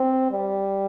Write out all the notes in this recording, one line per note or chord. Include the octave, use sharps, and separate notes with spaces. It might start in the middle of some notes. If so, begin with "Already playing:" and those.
Already playing: C4
G3